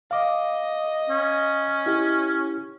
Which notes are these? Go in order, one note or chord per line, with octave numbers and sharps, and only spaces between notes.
D#5 F5 D6
C#4
E4 G4